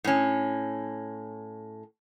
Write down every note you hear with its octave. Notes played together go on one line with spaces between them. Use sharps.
A2 C#4